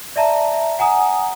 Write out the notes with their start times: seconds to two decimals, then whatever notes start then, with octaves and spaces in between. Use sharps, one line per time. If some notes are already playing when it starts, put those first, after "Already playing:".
0.16 D5 E5 A5 A#5
0.79 F#5 G#5 A#5 D#6